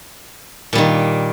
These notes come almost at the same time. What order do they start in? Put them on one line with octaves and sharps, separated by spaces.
A#2 G3 D#3